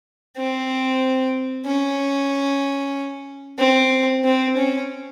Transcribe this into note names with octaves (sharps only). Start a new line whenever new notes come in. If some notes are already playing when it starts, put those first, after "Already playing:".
C4
C#4
C4
C4
C#4